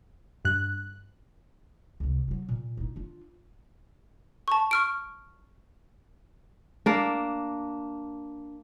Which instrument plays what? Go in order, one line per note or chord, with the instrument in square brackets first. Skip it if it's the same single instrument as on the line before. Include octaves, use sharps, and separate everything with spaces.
[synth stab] G2 F#6
[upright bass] C#2 C3
E3 F#3
A#2
D4 D#4
D4 F4
[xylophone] A5 C#6
C#6 F6 D7
[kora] A#3 D4